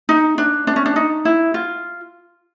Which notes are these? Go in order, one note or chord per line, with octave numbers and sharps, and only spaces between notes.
D#4
D4
D4
C#4
D4
D#4
E4
F4